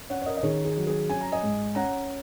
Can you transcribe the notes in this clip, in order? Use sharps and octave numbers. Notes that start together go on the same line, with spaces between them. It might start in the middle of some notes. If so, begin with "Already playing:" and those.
C#4 C#5 F#5
C#5
A#4 D#5
D#5
D#3 G#4 C#5
G#4
F#3
G#4
C#4 G#5
A#5
D#5 G#5
G#2
C#4 F#5 A#5